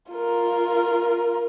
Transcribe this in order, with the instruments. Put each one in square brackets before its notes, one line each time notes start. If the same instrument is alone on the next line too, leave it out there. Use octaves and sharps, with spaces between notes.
[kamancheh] F4 A#4